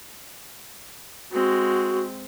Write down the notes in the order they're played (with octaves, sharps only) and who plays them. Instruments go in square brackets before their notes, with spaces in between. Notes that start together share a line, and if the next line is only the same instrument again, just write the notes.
[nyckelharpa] G#3 C4 [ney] F#4